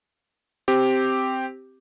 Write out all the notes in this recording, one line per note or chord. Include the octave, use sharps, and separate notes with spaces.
C4 G4